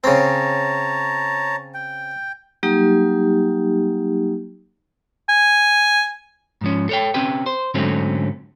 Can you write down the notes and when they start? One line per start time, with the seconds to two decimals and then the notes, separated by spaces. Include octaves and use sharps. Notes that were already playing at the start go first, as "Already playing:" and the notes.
0.04 C#3 C4 C#5 A5 A#5
1.74 G5
2.63 F#3 G3 A#3 D#4 G4
5.29 G#5
6.61 G#2 F3 C#4
6.89 A4 C#5 G5
7.14 C4 C#4 G4 B4 G5
7.46 C5
7.74 G#2 D3 F#3 A3 C4 C#4